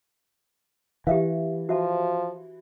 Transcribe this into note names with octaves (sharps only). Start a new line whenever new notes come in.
E3 G4 E5 F5
F3 F#4 E5 A5